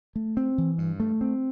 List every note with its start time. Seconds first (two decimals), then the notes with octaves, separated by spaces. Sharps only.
0.16 A3
0.37 C4
0.58 E3
0.78 G2
1.00 A3
1.21 C4